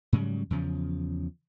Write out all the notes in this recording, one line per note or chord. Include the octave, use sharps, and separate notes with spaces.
G#2 C#3 F#3 G3
E2 C#3 F3